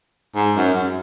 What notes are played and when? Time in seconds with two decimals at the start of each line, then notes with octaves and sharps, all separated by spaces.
0.36 G#2
0.56 F#2
0.74 F#2